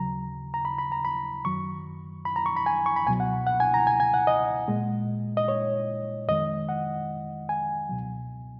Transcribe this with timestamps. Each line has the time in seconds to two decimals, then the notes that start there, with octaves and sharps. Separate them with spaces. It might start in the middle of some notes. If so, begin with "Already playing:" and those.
Already playing: D#2 C#3 F#3 A#5
0.54 A#5
0.65 B5
0.78 B5
0.92 A#5
1.05 B5
1.45 F#2 D#3 F#3 C#6
2.25 B5
2.36 A#5
2.46 C#6
2.56 B5
2.66 G#5
2.86 C#6
2.96 B5
3.06 C#2 B2 F#3 G#5
3.20 F#5
3.47 F#5
3.60 G#5
3.74 A#5
3.87 G#5
4.00 G#5
4.14 F#5
4.27 D#5
4.68 A#2 G#3
5.37 D#5
5.48 C#5
6.28 F2 D#3 G#3 D#5
6.69 F#5
7.49 G#5
7.89 C#2 B2 F#3